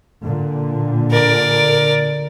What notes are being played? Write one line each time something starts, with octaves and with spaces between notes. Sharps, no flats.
A#2 D3
A#4 D5